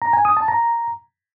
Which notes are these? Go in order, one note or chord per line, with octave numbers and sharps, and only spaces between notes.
A#5
G#5
D#6
A5
A#5